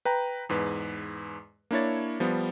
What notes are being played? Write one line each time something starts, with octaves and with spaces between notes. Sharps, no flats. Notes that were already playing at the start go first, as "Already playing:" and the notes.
B4 G5 A#5
E2 G#2 B4
A#3 D4 E4 C#5 A6
F3 G3 B3